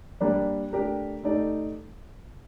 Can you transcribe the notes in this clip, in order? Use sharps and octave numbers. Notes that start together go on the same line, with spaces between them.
G3 A#3 D4 G4 A#4
A3 D4 G4 A#4
A3 D#4 G4 D5